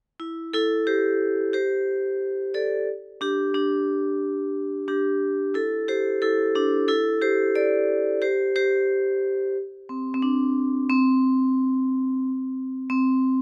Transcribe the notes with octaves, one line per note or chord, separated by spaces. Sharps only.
E4
E4 A4
G4 C5
G4 C5
A4 D5
D4 G4
D4 G4
D4 G4
E4 A4
G4 C5
E4 A4
D4 G4
E4 A4
G4 C5
A4 D5
G4 C5
G4 C5
C4
C4
D4
C4
C4